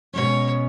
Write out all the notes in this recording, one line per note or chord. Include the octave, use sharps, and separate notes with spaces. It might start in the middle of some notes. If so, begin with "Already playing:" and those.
B2 G#3 C#4 C#5